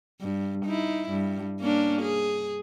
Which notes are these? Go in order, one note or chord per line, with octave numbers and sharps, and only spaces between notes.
G2
D#4 E4
G2
A#3 C#4 D4
G#4